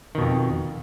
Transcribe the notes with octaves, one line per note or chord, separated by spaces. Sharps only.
F2 B2 D#3